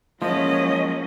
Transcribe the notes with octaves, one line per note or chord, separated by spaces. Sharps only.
F3 F#3 G#3 A#3 C#4 E4 D#5